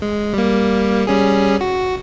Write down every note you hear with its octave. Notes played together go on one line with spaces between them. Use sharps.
G#3
G3 A#3
G3 C#4 G#4
F#4